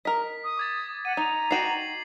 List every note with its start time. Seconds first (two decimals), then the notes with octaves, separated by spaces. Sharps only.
0.05 A#4 D#5 B6
0.44 D#6
0.57 D6 G#6 A6
1.05 F#5 D#7
1.17 D#4 A#5
1.51 D#4 F#4 G5 C7 F#7